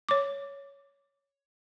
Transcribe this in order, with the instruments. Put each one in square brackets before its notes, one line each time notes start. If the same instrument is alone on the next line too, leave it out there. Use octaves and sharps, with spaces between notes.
[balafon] C#5 D6